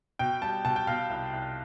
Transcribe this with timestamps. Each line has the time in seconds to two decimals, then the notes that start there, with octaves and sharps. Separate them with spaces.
0.19 B2 G5
0.42 G3 A5
0.65 B2 A5
0.76 G5
0.87 B2 F5
1.10 C2
1.33 C2